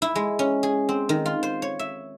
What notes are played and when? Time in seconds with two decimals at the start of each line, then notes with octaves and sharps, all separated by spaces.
0.02 E4
0.15 G#3
0.39 C#4
0.63 G#4
0.89 C4
1.09 D#3
1.26 F4
1.43 C5
1.62 C#5
1.79 E5